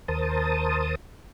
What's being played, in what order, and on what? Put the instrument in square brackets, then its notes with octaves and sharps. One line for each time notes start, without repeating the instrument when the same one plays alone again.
[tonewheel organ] D#2 A#4 C5 A5 D#6